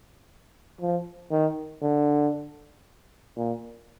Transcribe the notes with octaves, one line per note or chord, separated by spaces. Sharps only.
F3
D#3
D3
A#2